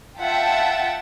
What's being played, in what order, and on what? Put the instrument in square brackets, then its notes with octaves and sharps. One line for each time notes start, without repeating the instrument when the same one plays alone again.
[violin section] F4 E5 F#5 G5 A5